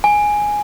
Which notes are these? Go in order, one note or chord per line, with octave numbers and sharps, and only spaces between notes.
G#5